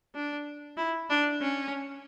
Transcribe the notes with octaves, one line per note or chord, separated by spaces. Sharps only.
D4
E4
D4
C#4